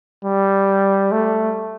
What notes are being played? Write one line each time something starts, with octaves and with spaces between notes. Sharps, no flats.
G3
A3